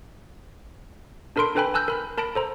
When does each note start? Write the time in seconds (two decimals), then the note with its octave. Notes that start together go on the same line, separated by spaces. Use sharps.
1.36 D4 A4 A#4 B5 C6 D7
1.55 D4 A4 B4 G5 G#5 B5
1.74 G#5 A5 E6 F#6 G6 A#6
1.88 A#4 B5 F6
2.18 A#4 A5 B5 A#6 D7
2.35 A4 C5 A#5